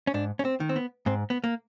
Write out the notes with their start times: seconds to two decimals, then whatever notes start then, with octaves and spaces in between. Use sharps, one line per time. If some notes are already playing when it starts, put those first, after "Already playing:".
0.07 C#4
0.14 G#2 D4
0.39 C#4
0.45 C4
0.60 D#3
0.69 C4
0.76 B3
1.06 G#2 C4
1.30 B3
1.44 A#3